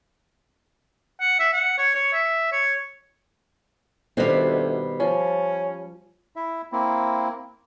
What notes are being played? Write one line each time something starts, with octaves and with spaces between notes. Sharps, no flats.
F#5
E5
F#5
C#5
C#5
E5
C#5
D2 B2 D#3 G3 C4 F#4
F3 C#4
E4 E5
A#3 C4 E4